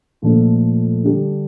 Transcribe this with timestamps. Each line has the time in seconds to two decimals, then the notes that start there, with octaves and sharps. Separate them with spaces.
0.22 A#2 F3 A3 D4 A4
1.04 D3 G3 D4 G4